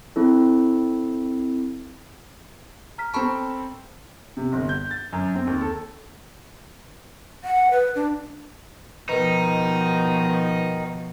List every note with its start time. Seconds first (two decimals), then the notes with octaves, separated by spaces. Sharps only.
0.16 C4 E4 A4
2.98 A#5 F6 B6
3.14 C4 A4 A5 B5 C#6
4.37 C3
4.52 G1
4.69 G6
4.91 A6
5.13 F#2
5.35 C4
5.47 D#2
5.61 A4
7.44 F#5
7.71 B4
7.96 D4
9.09 B2 D#3 F3 D#4 B4